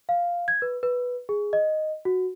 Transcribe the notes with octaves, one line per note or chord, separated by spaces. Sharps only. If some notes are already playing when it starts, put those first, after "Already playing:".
F5
G#6
B4
B4
G#4
D#5
F#4